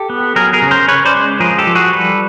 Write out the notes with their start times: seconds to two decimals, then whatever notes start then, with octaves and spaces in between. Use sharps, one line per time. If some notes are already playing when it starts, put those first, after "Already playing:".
Already playing: G4 A4
0.10 B3
0.36 F#3 G#4 A#4
0.53 G#4 A#4
0.62 C#3
0.71 A#4 C5
0.88 C#4 B4 C#5
1.05 C5 D5
1.15 G#3
1.40 F3 G#4 A#4
1.58 G4 A4
1.67 F3
1.75 F#4 G#4
1.93 G3 A4 B4